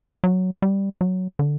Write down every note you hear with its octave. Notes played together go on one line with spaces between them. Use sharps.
F#3
G3
F#3
D3